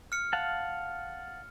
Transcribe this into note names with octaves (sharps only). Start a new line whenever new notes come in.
F6 C#7
F5 F#5 A5